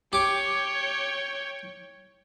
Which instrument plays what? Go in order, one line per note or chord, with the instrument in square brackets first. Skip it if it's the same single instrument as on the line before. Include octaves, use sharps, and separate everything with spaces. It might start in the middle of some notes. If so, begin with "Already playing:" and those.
[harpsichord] G4 D6 [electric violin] C#5 G5